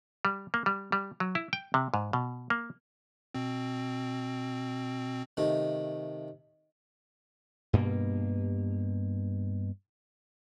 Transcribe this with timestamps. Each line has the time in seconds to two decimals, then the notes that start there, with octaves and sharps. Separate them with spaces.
0.25 G3
0.54 A#3
0.66 G3
0.92 G3
1.20 F#3
1.35 E4
1.53 G5
1.74 C3
1.94 G#2
2.13 B2
2.50 A#3
3.34 B2 C4
5.37 C3 D#3 A3
7.73 G2 B2 A#3